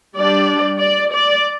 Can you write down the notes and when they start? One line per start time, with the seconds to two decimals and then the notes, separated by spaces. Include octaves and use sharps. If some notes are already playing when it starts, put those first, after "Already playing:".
0.14 G3 D4 D5
0.80 D5
1.13 D5